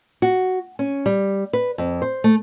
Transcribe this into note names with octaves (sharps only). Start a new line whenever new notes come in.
F#4
C#4
G3
B4
F2
C5
A3